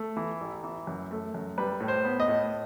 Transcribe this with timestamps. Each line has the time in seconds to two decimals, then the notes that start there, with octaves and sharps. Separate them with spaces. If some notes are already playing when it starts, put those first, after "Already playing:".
Already playing: A3
0.17 E3
0.41 A1
0.64 E3
0.87 F#2
1.11 A3
1.34 F#2
1.58 G3 B4
1.81 A2
1.88 C5
2.05 B3
2.20 D#5
2.28 A2